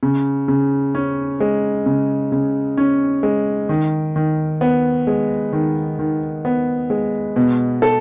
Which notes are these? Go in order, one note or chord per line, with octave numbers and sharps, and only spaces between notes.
C#3
C#3
C#4
G#3
C#3
C#3
C#4
G#3
D#3
D#3
B3
G#3
D#3
D#3
B3
G#3
B2
A4